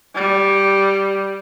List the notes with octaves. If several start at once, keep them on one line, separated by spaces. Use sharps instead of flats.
G3